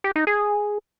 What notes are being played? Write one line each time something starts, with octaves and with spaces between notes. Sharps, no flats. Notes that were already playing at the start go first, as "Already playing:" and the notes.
G4
D#4
G#4